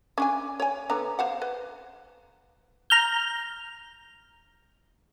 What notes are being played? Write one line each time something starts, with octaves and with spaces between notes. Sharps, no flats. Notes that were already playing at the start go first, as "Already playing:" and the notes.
C#4 D4 G#5
C#5 G5 G#5
D3 B3 A#5
C5 F5 F#5
B4
A#5 F6 G6